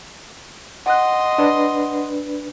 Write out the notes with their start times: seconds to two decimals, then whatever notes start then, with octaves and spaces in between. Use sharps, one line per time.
0.86 D#5 F#5 C6 F#6
1.38 D4 B4